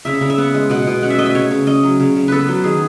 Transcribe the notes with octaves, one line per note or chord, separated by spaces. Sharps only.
C#3 E5
C#3
E5
B3 F#5
G#3
B2 F#5
B2
C#4 F#5
E5
A3 D#5
E5
C#3 C#5
C#3
C#4 D#5
F#3
C#3
C#3
B3 A4 B4
F#3
D#3 G#4